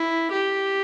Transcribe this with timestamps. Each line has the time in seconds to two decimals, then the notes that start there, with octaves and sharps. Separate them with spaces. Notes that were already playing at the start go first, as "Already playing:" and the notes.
Already playing: E4
0.31 G4